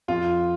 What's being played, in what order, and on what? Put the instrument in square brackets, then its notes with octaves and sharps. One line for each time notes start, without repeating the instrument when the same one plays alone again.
[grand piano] F2 F4